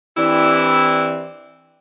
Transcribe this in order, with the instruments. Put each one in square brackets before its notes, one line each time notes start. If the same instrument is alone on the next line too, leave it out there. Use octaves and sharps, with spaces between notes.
[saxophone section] E3 C4 D4 E4 G4 D5